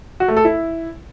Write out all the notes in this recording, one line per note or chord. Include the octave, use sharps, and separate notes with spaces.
F#4
A3
A4
E4